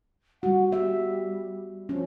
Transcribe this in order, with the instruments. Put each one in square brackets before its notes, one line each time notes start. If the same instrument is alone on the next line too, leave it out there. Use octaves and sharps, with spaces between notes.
[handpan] G3 F#4 [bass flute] F#5
[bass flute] G3 [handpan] B3 G4 E5
[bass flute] F3 [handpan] C#4